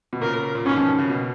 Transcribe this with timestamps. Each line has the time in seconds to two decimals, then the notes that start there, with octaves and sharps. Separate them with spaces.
0.13 B2
0.21 A#2 C#3 A#4
0.55 A#2
0.65 G#2 B2 C#4
0.76 F3
0.88 D#3
0.99 C#3
1.09 B2